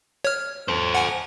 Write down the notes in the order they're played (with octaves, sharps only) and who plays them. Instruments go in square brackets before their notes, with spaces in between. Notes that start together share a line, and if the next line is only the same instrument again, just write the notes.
[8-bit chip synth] C#5 F6
[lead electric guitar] A4 C5
[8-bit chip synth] F#5 G#5